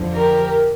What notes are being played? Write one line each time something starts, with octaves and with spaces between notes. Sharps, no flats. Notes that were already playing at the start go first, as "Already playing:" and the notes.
Already playing: F2 D3 F3
G4 A#4